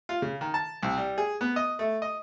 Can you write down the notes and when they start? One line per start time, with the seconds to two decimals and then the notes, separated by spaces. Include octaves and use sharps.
0.09 F4
0.22 C#3
0.41 D#3
0.54 A5
0.83 C2
0.97 G3
1.18 G#4
1.41 B3
1.56 D#5
1.79 A3
2.02 D#5